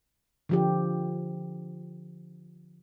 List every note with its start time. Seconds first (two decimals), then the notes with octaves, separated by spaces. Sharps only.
0.49 D3 F3 G4